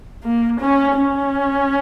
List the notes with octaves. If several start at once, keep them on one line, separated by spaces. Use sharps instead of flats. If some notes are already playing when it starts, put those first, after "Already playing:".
A#3
C#4
C#4